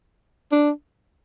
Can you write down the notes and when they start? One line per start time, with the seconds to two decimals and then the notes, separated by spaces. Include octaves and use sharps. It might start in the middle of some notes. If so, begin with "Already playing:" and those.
0.52 D4